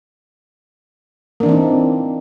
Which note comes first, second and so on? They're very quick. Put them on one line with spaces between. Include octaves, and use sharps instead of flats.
A#3 D4 E3 C4 D#4